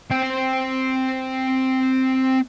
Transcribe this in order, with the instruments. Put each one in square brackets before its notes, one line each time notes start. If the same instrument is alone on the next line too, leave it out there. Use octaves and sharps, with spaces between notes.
[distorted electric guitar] C4 G5